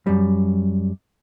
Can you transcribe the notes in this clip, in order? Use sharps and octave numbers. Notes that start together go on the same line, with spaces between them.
F#2 G3